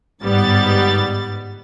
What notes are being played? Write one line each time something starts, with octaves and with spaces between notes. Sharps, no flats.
G1 G#2 G3 B3 A6